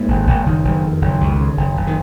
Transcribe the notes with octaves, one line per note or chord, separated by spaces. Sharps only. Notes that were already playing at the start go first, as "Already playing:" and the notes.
Already playing: G#2 A#3
G#1
G#1
F#1 D#3
F#1
F2
F#1
C#2
C#3
F#1
F#1
D#3